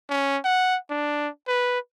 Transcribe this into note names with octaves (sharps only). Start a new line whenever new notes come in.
C#4
F#5
D4
B4